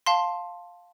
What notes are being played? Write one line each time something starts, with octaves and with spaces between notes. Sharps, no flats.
F5 A5 C6